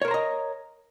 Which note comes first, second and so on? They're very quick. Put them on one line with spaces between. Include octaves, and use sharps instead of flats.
C#5 A#4 C5 A#5 D#5